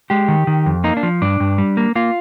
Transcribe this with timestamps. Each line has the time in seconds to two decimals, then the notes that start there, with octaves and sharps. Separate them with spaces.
0.10 G#3 G4
0.28 D#3
0.47 D#3
0.66 F2
0.84 A#3 D#4
0.97 D4
1.03 F3
1.22 G2 D4
1.40 G2
1.58 G3
1.77 A#3
1.96 A#3 F4